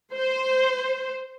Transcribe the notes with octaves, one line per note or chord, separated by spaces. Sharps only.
C5